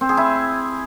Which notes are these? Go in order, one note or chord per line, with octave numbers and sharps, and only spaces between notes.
C4
G#4
E4